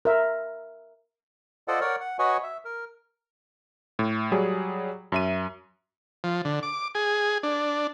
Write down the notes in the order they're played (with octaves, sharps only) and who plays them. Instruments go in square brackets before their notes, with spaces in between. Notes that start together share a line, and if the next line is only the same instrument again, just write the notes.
[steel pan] A#4 E5
[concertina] F4 A4 C5 D5 D#5 F#5
A#4 C#5 D5 F#5
F#5
F#4 B4 C#5 D#5 F#5 G#5
E5
A#4
[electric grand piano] A2
F#3 G3 G#4
F#2 E5 D#7
[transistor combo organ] F3
D3
D6
G#4
D4